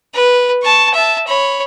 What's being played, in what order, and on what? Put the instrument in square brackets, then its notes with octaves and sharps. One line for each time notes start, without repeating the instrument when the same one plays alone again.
[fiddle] B4
A5 C#6
E5 A5
C#5 B5